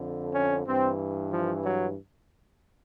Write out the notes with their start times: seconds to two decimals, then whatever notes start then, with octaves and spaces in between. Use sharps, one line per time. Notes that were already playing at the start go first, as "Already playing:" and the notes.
Already playing: F2 D3
0.34 C#4
0.66 G2 E3 C4
1.31 F3
1.64 F#3